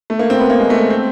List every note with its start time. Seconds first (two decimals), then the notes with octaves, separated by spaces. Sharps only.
0.10 A3
0.19 A#3
0.30 C4
0.40 B3
0.50 A#3
0.60 G#3
0.70 A3
0.90 C4